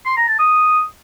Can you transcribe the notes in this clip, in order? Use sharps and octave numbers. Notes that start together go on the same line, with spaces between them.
C6
A#5
A5
D#6